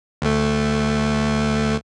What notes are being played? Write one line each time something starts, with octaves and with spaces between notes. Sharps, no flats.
D2 A3